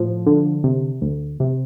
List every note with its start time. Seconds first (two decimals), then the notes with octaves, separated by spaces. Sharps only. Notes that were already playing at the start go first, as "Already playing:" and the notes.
Already playing: A2 F3
0.27 D3
0.64 C3
1.01 D2
1.40 C3